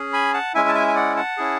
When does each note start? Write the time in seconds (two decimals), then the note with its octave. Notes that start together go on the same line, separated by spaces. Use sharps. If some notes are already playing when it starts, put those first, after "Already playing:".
Already playing: C#4 G#4
0.13 G#5 B5
0.34 F#5 A5
0.54 G#3 C#4 E4 E5 G#5
0.68 A5
0.75 E5 G#5
0.87 G#5
0.95 D5 F#5
1.16 F#5 A5
1.37 C#4 E4 G#4